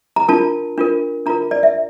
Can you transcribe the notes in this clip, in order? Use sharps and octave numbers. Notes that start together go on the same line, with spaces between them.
A#5
D4 F4 A#4 A5
D4 F4 A#4
D4 F4 A#4 A#5
D5
E5